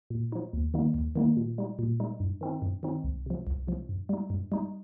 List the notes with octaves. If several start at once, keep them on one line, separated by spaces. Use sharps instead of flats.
A#2
F3 D#4
D#2
D#3 G3 A#3 D#4
D#2
D#3 G3 A#3 D#4
A#2
G3 D#4
A#2
G3 D#4
G2
D#3 C4 D#4
G2
D#3 C4 D#4
C2
C3 F3
C2
C3 F3
G2
G3 D#4
G2
G3 D#4